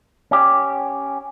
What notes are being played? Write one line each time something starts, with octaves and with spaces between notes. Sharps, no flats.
C#4 G4